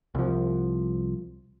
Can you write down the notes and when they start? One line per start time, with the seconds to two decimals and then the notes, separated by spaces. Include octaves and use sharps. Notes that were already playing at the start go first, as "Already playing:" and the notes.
0.15 C2 F3